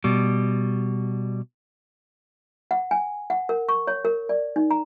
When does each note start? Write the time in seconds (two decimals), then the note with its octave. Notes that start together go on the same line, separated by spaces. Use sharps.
0.04 B2 G3
2.71 F#5
2.91 G#5
3.30 F#5
3.49 A#4
3.68 C#6
3.87 C#5
4.05 A#4
4.29 D5
4.56 D#4
4.71 A#5